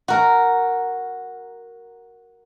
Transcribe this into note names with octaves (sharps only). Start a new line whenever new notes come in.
F#4 A#4